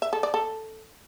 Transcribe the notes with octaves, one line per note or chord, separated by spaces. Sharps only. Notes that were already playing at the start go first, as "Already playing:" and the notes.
E5
A4
D5
A4